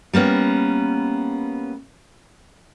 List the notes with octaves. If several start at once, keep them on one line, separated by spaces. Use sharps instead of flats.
G3 A#3 B3 C#4